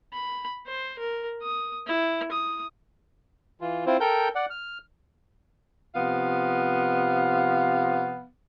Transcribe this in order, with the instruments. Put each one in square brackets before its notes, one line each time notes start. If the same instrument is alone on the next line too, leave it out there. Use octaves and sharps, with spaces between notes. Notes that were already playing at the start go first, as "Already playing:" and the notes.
[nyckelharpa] B5
C5
A#4
D#6
E4
D#6
[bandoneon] E3 F4
C4 E4 F4 C5
A4 A#4 G5 G6
D5 F#5
F6
[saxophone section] C3 F3 B3 F5